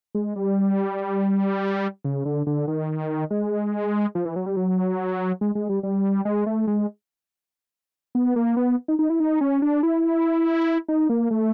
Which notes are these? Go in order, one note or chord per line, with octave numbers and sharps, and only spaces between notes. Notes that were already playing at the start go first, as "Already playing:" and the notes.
G#3
G3
C#3
D3
D3
D#3
G#3
F3
E3
F#3
G3
F#3
G#3
G#3
G3
G3
G#3
A3
G#3
B3
A#3
B3
D#4
D#4
E4
D#4
C#4
D4
E4
D#4
A#3
A3